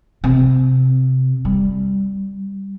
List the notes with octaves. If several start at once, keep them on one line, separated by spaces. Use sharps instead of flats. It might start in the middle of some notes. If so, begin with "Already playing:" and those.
C3
G3